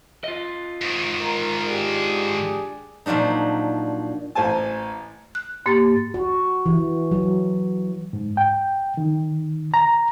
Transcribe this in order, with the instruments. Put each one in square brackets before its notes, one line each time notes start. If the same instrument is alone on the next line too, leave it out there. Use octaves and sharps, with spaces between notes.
[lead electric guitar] F4 D#5
[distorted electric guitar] G#2 D#3
[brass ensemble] A#4
D4 G4 G#4
[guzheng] A#2 F3 F#3 D4 D#4
[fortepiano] A1 C5 G#5 A5
[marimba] F#6
[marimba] G#2 A#3 [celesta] G4 A6
[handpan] F#4
E3
F#3
[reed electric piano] G#2
G5
D#3
A#5